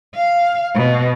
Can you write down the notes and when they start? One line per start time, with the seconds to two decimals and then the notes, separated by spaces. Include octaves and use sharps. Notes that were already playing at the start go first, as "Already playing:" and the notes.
0.15 F5
0.75 B2